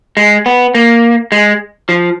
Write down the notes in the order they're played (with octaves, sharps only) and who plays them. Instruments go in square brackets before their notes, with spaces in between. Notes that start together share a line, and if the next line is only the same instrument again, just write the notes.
[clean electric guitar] G#3
B3
A#3
G#3
F3